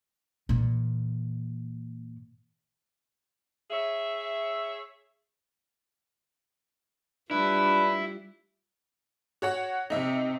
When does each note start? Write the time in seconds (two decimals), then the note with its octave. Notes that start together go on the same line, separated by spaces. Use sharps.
0.49 A#2 E3
3.71 G#4 C#5 E5
7.31 G3 D4 E4 F4 B4
9.42 F#4 C#5 F#5
9.90 C3 D#4 E5